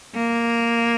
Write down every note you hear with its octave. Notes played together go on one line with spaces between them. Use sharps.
A#3